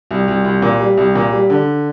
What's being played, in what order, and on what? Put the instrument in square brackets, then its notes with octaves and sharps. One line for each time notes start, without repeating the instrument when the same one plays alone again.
[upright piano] C2
C2
C2
A#2
G3
C2
A#2
G3
D3